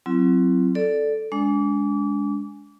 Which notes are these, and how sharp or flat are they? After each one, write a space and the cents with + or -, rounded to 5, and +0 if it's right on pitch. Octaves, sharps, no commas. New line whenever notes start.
F#3 +0 C4 +0 E4 +40
A4 +0 D5 +0
G#3 +0 D4 -35 D6 -30